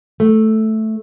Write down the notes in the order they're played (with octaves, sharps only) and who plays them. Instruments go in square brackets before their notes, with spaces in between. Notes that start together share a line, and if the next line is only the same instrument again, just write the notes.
[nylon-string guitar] A3